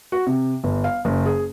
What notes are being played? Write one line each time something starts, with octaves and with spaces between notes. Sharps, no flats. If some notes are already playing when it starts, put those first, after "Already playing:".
F#4
C3
G1
F5
F#1
G#4